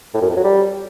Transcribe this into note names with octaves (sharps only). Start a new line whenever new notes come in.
A2
F#2
F2
F#3
G3